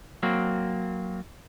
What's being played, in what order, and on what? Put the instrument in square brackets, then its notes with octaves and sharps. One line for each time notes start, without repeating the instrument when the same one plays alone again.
[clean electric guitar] F#3 A#3 C4